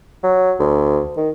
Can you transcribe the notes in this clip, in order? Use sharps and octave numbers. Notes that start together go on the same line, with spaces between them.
F#3
D2
D#3